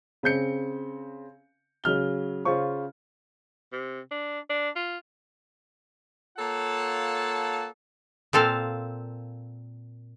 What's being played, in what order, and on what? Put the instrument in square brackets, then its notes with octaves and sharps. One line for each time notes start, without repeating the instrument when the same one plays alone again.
[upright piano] C#3 C4 G6 C#7
C#3 F#3 F6 G7
C#3 C#4 F4 C5 C#6
[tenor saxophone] C3
D4
D4
F4
[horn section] A#3 F4 A4 C#5 F#5 A5
[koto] A#2 C4 A4 F5